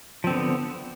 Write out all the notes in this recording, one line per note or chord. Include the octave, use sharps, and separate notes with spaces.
D3 F3 B3 C4